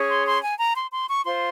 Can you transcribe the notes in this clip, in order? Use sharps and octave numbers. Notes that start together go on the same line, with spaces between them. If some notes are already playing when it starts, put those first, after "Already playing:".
Already playing: C#4 G#4 C#5
C6
C6
G#5
A#5
C6
C6
C#6
F4 C5 C6